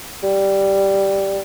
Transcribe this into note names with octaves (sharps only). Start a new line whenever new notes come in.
G3